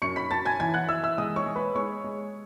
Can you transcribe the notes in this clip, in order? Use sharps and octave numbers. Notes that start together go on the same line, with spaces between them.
F#2 C#6 C#7
B5 B6
F#2 A5 A6
G#5 G#6
E3 G#5 G#6
F#5 F#6
E3 E5 E6
E5 E6
G#3 D#5 D#6
C#5 C#6
G#3
B4 B5
G#3 C#5 C#6
G#3